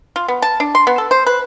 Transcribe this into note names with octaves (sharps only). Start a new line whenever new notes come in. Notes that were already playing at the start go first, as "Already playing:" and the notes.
F4
B3
A5
D4
C6
B3
A4
C5
B4